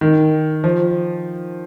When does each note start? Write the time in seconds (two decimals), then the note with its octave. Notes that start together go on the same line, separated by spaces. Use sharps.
0.01 D#3
0.64 F3